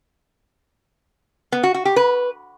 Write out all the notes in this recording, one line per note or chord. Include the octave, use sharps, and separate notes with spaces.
B3
F#4
F#4
G4
B4